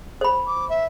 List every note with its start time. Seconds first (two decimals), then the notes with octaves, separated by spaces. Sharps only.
0.21 C5 B5
0.46 D6
0.69 E5